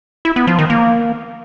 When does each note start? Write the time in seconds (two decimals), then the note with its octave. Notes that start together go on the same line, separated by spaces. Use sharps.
0.25 E4
0.36 B3
0.47 F3
0.59 D#3
0.70 A#3